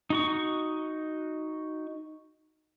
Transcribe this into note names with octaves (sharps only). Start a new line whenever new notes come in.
D#4 F#4 C#6